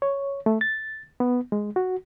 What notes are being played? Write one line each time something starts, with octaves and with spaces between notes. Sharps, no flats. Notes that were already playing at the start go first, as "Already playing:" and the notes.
C#5
A3
A6
B3
G#3
F#4